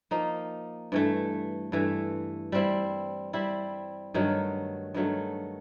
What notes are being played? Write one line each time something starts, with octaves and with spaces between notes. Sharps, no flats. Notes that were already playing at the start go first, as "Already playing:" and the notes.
F3 A#3 D#4
G2 E3 A3
G2 E3 A3
G3 C4 E4
G3 C4 E4
G2 D#3 F#3 A3
G2 D#3 F#3 A3